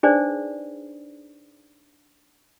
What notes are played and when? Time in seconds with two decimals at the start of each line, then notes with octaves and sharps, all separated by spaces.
0.03 D4 D#4 G#4 B4 C5 D5